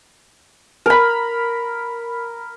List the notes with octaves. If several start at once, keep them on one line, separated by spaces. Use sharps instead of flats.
A#4 B5